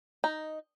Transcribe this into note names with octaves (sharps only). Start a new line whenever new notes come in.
D#4